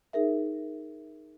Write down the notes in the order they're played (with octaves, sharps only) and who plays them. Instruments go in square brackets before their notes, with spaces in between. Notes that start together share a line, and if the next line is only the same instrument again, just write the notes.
[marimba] D#4 G#4 A#4 E5